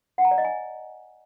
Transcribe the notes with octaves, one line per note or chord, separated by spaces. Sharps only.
F#5
A#5
D5
D#5
G#5